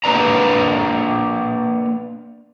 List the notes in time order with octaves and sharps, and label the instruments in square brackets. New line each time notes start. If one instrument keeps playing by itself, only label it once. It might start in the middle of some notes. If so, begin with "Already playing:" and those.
[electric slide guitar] A#3 D4 B4 D5 A#5